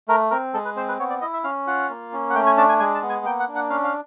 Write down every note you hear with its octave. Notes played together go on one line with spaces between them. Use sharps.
A3 A#4
C4 A#4
G#3 A4
B4
C4 C5
B4
B3 C#5
D5
E4 D#5
E5
C#4 F5
F4 F#5
A#3
C#4
F#5
A3 G5
G#5
D4 A5
G#5
G#3 G#5
A5
B3
G#5
A#3 G5
F#5
D4
F#5
C#4 F5
F5